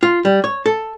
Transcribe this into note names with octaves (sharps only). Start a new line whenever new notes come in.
F4
G3
C#5
A4